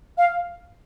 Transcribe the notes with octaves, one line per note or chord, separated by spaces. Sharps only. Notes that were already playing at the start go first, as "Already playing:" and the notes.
F5